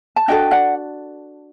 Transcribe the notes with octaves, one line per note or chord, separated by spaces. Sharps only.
A5
D4 F#4 A4 D#5 G5
D5 F#5